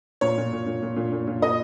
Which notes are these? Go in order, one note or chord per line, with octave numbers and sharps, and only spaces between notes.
A#2 C#5
A#2
A#2
A#2
A#2
A#2
A#2
A#2
A#2 D#5